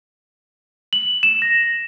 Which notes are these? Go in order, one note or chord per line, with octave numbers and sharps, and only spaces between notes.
F#7
E7
A#6